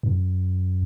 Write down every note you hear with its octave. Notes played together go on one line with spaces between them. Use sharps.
F#2